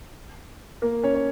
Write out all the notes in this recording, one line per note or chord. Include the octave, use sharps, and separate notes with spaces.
A#3 A#4
C#4 C#5
C#5